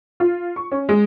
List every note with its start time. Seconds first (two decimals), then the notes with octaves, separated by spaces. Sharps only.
0.20 F4
0.56 C#6
0.72 C#4
0.89 G#3